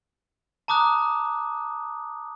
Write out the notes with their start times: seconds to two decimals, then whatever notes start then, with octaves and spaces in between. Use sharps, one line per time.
0.68 A5 A#5 D6 D#6 F#6